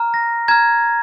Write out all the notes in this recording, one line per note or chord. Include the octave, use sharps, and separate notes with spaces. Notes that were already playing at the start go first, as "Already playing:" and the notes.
Already playing: A#5 F6
A#6
A#5 F6 G#6